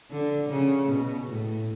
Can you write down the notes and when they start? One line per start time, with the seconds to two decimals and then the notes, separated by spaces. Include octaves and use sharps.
0.10 D3
0.50 C#3
0.89 B2
1.28 A2